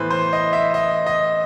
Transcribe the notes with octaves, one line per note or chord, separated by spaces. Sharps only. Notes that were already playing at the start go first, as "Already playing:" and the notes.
Already playing: A2 E3 B3 B4 C5
C5
D#5
E5
D#5
D#5